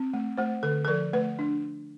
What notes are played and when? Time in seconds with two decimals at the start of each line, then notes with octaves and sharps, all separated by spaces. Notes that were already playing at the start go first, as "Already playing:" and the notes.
Already playing: C4
0.14 A3
0.38 A3 C5
0.63 D3 A4
0.85 A4
0.88 F3 A#4
1.13 A3 B4
1.39 D4